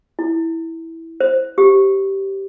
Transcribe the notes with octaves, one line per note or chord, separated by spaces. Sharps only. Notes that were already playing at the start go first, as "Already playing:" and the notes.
E4
C5
G4